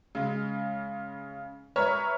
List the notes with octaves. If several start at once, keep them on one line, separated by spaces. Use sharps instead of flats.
C#3 G#3
B4 C#5 E5 A#5 C#6 F6